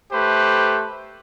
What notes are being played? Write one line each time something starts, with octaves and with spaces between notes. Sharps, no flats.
A3 G4 B4 C5